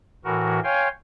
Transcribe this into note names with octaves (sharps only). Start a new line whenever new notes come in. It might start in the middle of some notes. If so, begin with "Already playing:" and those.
A2 E3 F#4 A#4
C#5 F5 G5 G#5 C6